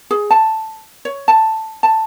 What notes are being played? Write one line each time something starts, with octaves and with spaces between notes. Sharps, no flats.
G#4
A5
C#5
A5
A5